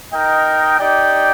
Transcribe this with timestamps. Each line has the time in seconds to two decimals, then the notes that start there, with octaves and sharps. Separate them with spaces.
0.12 D#4 A#4 D#5 G5
0.78 D#4 G4 D5 G5